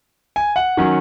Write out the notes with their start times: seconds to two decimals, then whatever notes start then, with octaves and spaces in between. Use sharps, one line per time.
0.36 G#5
0.56 F#5
0.77 D#3 F#3 C#4